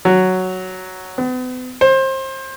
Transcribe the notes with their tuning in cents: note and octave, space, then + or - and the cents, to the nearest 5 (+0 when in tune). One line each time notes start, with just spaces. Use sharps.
F#3 +5
B3 +40
C5 +25